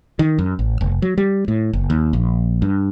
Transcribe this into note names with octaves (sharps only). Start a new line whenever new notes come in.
D#3
F#2
A1
F1
F#3
G3
A2
F#1
D#2
A#1
G2